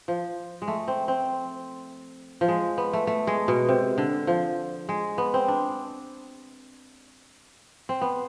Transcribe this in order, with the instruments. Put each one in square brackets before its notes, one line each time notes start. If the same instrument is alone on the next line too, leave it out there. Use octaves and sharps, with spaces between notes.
[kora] F3
G#3
A3
C4
C4
F3
G#3
B3
A3
A3
G#3
B2
C3
D3
F3
G#3
B3
C4
D4
C4
B3